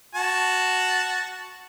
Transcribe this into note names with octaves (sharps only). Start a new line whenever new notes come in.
F#4 A5